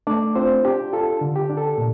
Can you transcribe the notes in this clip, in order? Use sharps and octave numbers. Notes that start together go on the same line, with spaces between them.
A3 D4 D5
C4 F4 C5
D4 G4
F4 A4
D3
G4
D4
A4
A#2